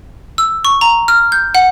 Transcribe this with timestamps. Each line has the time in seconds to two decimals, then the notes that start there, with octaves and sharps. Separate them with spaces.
0.38 E6
0.65 C#6
0.81 A#5
1.08 F6
1.32 G6
1.55 F#5